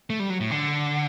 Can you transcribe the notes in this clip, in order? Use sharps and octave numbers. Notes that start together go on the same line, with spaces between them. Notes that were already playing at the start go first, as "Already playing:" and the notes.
A3
G3
F#3
A2
D3